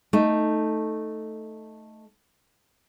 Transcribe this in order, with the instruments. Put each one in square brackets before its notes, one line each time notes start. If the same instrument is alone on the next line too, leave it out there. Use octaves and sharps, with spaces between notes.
[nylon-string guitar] A3 D#4